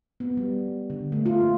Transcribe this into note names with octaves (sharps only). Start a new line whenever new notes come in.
B3
G3
D3
A3
F4
A#3